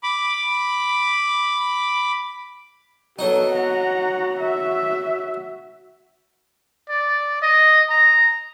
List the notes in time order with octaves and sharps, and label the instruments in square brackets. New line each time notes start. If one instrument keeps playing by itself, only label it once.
[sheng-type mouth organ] B5 D6
[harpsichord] F#3 D#4 [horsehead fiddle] B3 A4 [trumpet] F#4
[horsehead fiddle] F#5 A#5
E5
[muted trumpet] D5
D#5
A#5